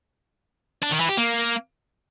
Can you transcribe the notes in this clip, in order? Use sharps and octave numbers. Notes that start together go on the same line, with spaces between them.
D4
D#3
E3
G4
A#3